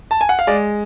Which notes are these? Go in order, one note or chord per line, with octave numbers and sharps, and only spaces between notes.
A5
G#5
F#5
F5
G#3 D5